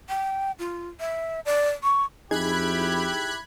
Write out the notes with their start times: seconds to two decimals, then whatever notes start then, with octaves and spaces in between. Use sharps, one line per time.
0.09 G5
0.59 F4
1.00 E5
1.45 D5
1.83 C#6
2.31 F2 D#4 E4 G4 G#4 B5 F#6 G#6